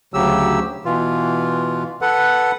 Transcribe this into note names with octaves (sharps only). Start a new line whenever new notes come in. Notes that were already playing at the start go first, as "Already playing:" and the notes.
D2 C#3 F#3 G4 E6
B2 E3 F4
A4 B4 F#5